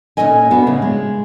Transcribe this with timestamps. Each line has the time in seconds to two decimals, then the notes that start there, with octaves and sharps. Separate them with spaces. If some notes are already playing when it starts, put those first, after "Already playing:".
0.17 A#2 F3 C#4 A4 D#5 G#5
0.51 B3 D4 F#4
0.67 A2 C#3
0.82 G#3